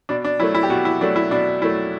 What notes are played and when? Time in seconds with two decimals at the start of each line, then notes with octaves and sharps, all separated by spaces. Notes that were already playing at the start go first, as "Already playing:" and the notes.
0.09 B2 D4
0.25 D4
0.40 F#3 A3 E4
0.55 E4
0.63 G4
0.70 B2 F#4
0.85 E4
1.01 F#3 A3 D4
1.16 E4
1.31 B2 D4
1.62 F#3 A3 E4